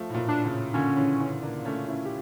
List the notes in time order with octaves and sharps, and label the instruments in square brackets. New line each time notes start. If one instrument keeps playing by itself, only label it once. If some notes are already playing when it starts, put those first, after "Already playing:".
Already playing: [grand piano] F3 A3
A2
A#2
[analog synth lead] D4
[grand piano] A2 C#3
[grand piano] A#2 D3 [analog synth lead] C#4
[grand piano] C#3 E3
C#3 E3
A#3 D4
A3 C#4
C#4 E4
G4